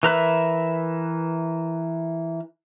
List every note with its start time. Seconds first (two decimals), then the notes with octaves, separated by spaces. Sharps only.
0.03 E3 A#4 B4 E5